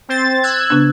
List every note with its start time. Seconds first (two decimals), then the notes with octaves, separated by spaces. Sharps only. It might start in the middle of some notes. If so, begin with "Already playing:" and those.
0.09 C4 C5 A6
0.43 E6 F#6 G#6
0.70 C#3 B3 D4